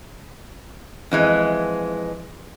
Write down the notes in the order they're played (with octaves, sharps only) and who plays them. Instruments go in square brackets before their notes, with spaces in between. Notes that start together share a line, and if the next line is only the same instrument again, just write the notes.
[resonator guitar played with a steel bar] F2 E3 G#3